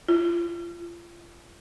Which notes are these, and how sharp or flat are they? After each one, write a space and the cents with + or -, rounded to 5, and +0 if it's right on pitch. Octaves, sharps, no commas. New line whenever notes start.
F4 -30